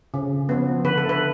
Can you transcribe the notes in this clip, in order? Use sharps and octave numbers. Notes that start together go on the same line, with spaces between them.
C#3
F3 B3
D3 B4
A4
B4